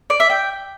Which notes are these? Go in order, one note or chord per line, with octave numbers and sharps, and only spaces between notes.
D5
E5
G5